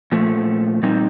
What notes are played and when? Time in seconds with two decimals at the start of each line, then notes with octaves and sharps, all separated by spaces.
0.12 A#2 F3 A3
0.83 A#2 G3 C4 D#4